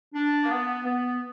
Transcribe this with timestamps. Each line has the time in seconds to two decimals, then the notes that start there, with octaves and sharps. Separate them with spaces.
0.14 D4
0.42 A#3
0.50 B3
0.84 B3